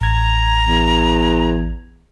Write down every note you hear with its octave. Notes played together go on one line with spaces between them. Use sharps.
A1 A#5 G#6
E2